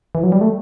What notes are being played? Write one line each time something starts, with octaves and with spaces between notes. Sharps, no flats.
E3
F#3
G3
A3